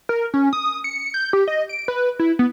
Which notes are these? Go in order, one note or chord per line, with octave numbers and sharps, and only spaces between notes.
A#4
C#4
D#6
C#7
G6
G4
D#5
D7
B4
E4
B3